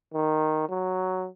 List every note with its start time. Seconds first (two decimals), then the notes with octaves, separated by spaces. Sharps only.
0.14 D#3
0.69 F#3